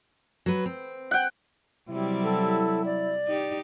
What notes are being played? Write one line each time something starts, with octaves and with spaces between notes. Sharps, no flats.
F#3 B4
C4
F#5 G5
C3 F#3 G3 E4
A4
D5
D#4 G4